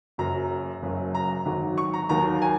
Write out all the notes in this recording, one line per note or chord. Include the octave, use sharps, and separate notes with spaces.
F#1 F#2 F#3 A#5
F#1 F#2 C#3 F#3
A#5
G#1 G#2 F#3
C#6
A#5
D#2 D#3 F#3 A#5
G#5